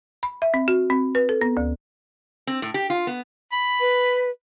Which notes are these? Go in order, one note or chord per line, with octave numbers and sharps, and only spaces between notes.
B5
E5
C4
F#4
C4
B4
A4
B3
D2
C4
A2
G4
F4
B3
B5
B4